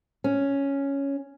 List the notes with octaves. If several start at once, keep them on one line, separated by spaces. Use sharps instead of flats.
C#4